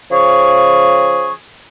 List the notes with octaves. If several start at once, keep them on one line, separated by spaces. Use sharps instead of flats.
C#3 F3 G#4 C#6